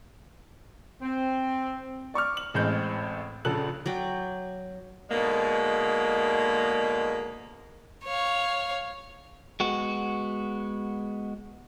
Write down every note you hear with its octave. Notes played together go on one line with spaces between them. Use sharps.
C4
D5 C#6 D6 F6
F#7
A1 A2 G#3 C4 G6
A#1 C#3 A4 F#6 F#7
F#3 D5 G5
G#2 B2 D3 G#3 A#3
C#5 F5
G#3 B3 F#4